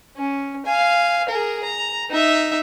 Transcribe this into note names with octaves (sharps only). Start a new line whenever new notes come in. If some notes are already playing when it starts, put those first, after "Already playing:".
C#4
F5 G#5
G#4 A#4
A#5
D#4 E5